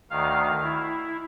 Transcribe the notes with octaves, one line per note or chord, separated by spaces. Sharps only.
D2 D#3 F5
E4